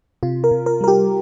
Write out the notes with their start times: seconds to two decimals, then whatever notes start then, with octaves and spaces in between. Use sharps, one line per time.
0.23 C3 F4
0.44 A#4
0.51 C3
0.66 A#4
0.81 G3 A#4
0.88 G4